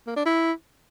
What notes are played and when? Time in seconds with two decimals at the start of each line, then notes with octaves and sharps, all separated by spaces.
0.07 A#3
0.16 D4
0.26 E4